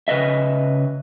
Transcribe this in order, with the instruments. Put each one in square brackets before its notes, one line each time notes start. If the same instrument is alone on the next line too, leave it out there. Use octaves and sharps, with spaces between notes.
[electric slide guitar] C#3 B4 D#5 E5